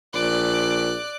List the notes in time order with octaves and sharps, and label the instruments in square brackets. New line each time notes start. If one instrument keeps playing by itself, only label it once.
[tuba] A#1 [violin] D5 F#6